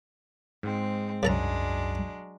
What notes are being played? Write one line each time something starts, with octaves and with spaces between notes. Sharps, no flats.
G#2 G#3 C4
C2 F#2 C#3 F#3 G#3 D4 A4 A#5